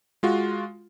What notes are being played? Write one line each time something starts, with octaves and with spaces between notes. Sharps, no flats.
G#3 F4 F#4